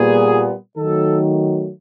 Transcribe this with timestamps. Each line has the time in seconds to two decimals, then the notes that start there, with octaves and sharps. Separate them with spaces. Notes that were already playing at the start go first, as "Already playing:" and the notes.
Already playing: A#2 G3 B3 G#4
0.77 D#3 F#3 A3 A4